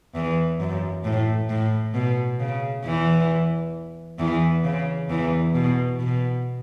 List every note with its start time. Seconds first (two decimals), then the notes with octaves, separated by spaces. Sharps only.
0.15 E2 E3
0.60 F#2
1.04 A2
1.49 A2
1.94 B2
2.40 C#3
2.84 E2 E3
4.19 E2 E3
4.64 C#3
5.09 E2 E3
5.54 B2
6.00 B2